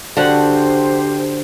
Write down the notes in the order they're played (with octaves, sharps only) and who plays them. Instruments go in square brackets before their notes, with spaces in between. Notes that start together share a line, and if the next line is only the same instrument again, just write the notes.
[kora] D3 F#4 F#5 [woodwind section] G4 C5